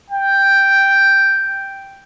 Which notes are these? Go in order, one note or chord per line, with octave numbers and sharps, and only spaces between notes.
G5